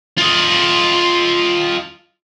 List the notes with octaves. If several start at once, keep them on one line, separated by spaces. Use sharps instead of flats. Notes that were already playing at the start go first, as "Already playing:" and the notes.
F4 D#5